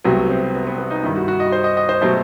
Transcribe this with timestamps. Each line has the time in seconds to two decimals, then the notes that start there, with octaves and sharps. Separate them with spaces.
0.05 C2 C3 F#3 A3 B3
0.29 C4
0.54 B3
0.67 B3
0.78 B3
0.90 D#4
1.03 G2 D#3 G3 E4
1.16 F#4
1.28 F#4
1.40 D#5
1.52 C5
1.64 D#5
1.77 D#5
1.89 C5
2.01 B2 F#3 A3 C5